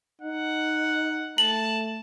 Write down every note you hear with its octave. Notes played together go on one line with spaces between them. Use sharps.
D#4 F#5
A3 A5 F#7